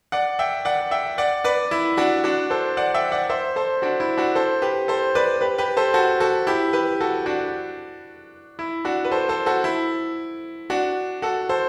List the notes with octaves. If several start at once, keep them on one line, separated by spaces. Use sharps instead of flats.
D5 F#5
E5 G5
D5 F#5
E5 G5
D5 F#5
B4 D5
E4
D4 F#4
D4 F#4
A4 C5
D5 F#5
E5 G5
D5 F#5
C5 E5
A4 C5
D4 F#4
E4
D4 F#4
A4 C5
G4 B4
A4 C5
B4 D5
G4 B4
G4 B4
A4 C5
F#4 A4
F#4 A4
E4 G4
G4 B4
F#4 A4
D4 F#4
E4
D4 F#4
B4
A4 C5
A4 C5
F#4 A4
E4
D4 F#4
F#4 A4
A4 C5